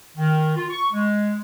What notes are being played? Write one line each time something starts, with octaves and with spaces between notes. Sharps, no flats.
D#3
F4
C#6
G#3